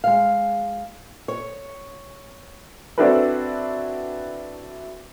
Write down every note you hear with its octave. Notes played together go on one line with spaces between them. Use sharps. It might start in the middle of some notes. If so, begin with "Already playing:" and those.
G#3 F5
C#5
C4 D4 E4 F#4 A4 B4